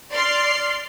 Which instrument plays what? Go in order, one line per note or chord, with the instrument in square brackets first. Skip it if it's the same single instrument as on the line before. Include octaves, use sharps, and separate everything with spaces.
[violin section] D5 C6 F6 C7